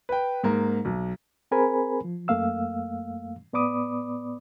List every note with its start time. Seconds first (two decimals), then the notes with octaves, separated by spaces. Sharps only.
0.09 B4 G5
0.43 G#2 A#3 A#5
0.85 B1
1.51 C4 G#4 A#4 C5 G#5 B5
2.04 F3
2.28 F#2 A3 A#3 F5 E6
3.53 A2 B3 D5 B5 D6 D#6